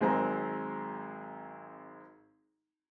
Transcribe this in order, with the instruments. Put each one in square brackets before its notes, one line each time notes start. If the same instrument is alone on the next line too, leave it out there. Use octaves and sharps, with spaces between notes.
[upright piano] G#1 F#3 G#3 C4 G#4 A#5